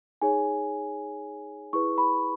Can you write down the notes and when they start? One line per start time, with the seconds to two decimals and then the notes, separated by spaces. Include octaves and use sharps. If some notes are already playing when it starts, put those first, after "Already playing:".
0.22 D#4 G#4 C#5 G#5
1.73 E4 G#4 B4 C#6
1.98 B5